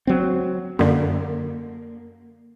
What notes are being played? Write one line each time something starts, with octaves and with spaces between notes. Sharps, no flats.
F#3 C4
F#2 D3 A#3